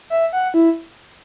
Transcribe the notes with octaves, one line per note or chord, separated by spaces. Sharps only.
E5
F#5
E4